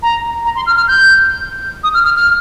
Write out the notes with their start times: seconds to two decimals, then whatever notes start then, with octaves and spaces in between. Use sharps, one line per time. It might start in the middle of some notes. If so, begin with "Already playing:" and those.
0.03 A#5
0.45 A#5
0.56 C6
0.66 F6
0.77 F6
0.88 G6
1.83 D#6
1.94 F6
2.05 F6
2.16 F6